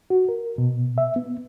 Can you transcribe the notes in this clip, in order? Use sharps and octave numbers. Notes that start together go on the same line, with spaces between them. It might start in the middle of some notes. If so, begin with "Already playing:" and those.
F#4
A#4
B2
E5
B3